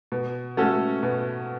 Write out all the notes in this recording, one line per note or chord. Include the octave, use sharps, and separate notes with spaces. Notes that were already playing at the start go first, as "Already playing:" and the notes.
B2
A3 C#4 F#4 A4
B2